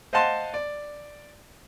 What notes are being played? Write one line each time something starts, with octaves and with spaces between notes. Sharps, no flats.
C5 D#5 F5 F#5 A5 C6
D5